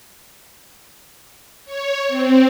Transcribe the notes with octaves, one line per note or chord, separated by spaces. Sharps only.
C#5
C4